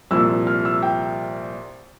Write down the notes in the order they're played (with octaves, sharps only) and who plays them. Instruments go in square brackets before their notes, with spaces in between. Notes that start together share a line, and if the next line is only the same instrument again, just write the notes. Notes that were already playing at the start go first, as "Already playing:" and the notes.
[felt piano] C2 A#2 F3 E6
F6
E6
G5